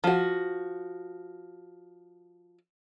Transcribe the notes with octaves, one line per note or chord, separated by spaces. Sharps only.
F3 F#4